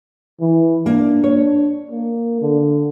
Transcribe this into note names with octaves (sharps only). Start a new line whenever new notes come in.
E3
A#3 D4
C#5
A#3
D3